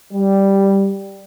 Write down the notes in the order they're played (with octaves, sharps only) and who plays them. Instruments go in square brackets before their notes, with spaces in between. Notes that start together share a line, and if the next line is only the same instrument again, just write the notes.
[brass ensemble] G3